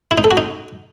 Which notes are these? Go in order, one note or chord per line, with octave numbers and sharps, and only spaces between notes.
E4
D#4
A4
F#4
D#4